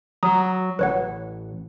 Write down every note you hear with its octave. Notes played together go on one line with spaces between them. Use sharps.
F#3 A#5 D#6
A1 B4 C#5 F#5